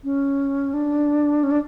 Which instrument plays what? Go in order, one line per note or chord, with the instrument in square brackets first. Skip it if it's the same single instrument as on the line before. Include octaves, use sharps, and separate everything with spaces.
[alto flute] C#4
D4
C#4
D4